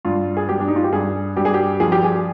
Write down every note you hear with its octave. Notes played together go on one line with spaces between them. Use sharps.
G2 F4
G#4
G2 G4
D4
D#4
F4
G4
G2 G#4
G2 G4
G#4
G4
F3 G#4
G4
G#4